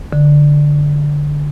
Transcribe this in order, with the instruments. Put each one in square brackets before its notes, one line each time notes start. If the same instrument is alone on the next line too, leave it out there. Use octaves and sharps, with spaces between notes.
[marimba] D3